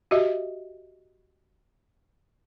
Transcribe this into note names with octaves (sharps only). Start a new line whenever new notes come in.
F#4 G4 D#5 E5